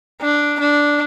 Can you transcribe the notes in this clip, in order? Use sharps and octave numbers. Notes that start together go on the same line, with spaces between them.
D4
D4